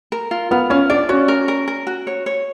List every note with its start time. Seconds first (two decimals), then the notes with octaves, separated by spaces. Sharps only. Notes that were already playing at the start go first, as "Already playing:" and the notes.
0.12 A#4
0.31 F4
0.51 B3 F4
0.70 C#4 F4
0.90 D4 D5
1.09 C#4 F#4
1.28 A#4
1.48 A#4
1.68 A#4
1.87 F#4
2.07 C#5
2.26 C#5